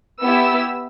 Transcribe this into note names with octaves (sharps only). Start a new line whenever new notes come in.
B3 E4 G4 E6